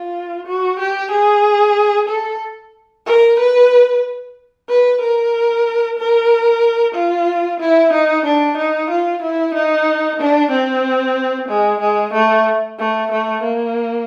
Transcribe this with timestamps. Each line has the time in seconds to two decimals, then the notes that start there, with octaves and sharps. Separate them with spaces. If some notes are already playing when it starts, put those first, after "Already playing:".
Already playing: F4
0.46 F#4
0.79 G4
1.11 G#4
2.08 A4
3.06 A#4
3.39 B4
4.69 B4
5.01 A#4
5.98 A#4
6.94 F4
7.60 E4
7.93 D#4
8.25 D4
8.57 D#4
8.90 F4
9.22 E4
9.54 D#4
10.19 D4
10.51 C4
11.48 G#3
11.80 G#3
12.13 A3
12.79 A3
13.11 A3
13.43 A#3